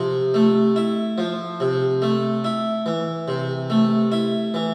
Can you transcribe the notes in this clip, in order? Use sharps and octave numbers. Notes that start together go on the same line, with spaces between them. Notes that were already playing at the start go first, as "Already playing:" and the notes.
Already playing: C3 F3
A3
E4
F3
C3
A3
E4
E3
C3
A3
E4
E3